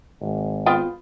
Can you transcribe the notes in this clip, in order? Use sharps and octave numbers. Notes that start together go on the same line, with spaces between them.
G#1
B3 F4 G5